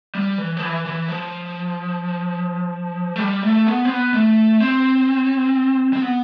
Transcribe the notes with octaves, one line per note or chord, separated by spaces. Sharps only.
G3
E3
F3
E3
E3
F3
A3
G3
A3
B3
C4
B3
A3
C4
C4
B3